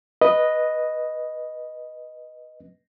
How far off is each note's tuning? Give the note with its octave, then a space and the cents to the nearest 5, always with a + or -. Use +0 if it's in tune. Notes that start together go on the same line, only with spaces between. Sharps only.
B4 -5 D#5 +0